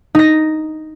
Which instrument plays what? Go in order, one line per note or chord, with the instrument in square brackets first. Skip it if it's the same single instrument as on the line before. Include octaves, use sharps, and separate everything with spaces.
[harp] D#4 A#6